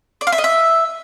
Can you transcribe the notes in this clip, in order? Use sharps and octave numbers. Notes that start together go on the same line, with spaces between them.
D5
F5
E5
D#5
E5